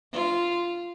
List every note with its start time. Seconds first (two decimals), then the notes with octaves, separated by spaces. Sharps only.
0.13 F4